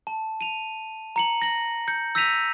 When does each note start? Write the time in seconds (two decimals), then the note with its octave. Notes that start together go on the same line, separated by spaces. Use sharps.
0.07 A5
0.41 D#7 F7
1.16 A#5 C#7 F#7
1.42 A#6 F#7
1.88 G6 C#7
2.15 E6 G6 A#6 B6 D#7 F7